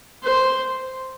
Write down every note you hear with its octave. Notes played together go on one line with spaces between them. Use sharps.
C5